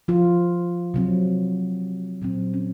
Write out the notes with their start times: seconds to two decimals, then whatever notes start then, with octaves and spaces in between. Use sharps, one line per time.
0.08 F3 F4
0.94 C3 F#3 C4
2.22 A#2 F#3 C4
2.54 C#4